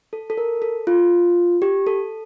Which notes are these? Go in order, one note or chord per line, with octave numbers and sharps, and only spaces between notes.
A4
A4
A#4
A4
F4
G4
A4